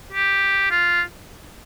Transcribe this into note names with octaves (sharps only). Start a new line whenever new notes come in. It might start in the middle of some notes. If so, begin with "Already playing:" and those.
G4
F4